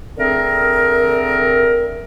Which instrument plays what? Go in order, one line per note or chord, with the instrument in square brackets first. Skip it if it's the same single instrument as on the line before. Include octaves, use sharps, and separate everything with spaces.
[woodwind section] D3 A3 C4 G#4 A#4